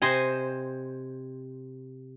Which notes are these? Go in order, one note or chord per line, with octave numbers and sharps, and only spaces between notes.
C3 C5 D#5 G#5